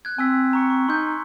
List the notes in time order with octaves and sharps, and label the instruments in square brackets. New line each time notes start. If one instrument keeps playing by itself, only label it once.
[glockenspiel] F#6 G#6
[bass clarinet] C4 [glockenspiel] G#5 E6 B6
[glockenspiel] A#5 C#6 C#7
C#6
[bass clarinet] D#4 [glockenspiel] C6 G6